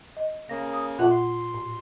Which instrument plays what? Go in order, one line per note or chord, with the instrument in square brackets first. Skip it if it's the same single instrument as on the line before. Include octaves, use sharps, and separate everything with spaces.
[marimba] D#5
[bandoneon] C#3 A#3 [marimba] A#6
[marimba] D#6
[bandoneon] F2 A3 F#6 [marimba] A#2 F4 F#5
[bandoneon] C6
[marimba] A2